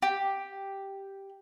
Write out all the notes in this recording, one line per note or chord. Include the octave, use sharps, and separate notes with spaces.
G4